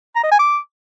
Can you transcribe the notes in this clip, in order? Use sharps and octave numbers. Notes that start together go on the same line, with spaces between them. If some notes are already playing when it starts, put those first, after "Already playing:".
A#5
D#5
G#5
D6